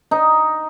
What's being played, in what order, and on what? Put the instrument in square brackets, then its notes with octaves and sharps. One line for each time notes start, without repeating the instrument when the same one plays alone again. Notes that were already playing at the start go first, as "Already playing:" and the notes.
[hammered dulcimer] D#4